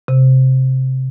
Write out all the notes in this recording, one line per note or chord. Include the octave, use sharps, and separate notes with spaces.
C3